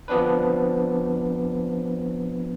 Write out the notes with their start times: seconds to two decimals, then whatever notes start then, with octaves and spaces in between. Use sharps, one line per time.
0.08 F3 B3 C4 D4 B4